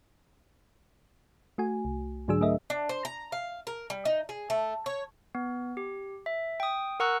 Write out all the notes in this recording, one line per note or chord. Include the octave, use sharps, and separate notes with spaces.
A3 F#4 G#5
C2
G#2 D3 F#3 D4 G#4 E6
A3 G#4 A#4 D#5 E5
D4
C5
A#5
F5
A#4
G3
D#4
G#4
A3
C#5
B3
G4
E5
G5 D#6
A#4 F#5 A#5 C#6 E6 F#6